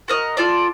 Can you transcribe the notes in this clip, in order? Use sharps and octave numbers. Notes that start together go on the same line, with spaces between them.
F#4 A#4 D#5
F4 A4 D5